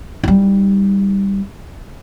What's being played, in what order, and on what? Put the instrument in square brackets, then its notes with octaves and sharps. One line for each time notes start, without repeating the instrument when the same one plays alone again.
[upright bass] G3 D#4